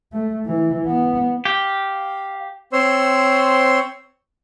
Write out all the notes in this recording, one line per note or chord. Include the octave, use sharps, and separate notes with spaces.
A3
E3
B3
G4 F5
C4 C5 C#5 C6 E6